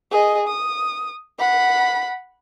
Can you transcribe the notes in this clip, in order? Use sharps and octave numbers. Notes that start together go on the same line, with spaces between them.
G#4 D#5
D#6
F#5 B5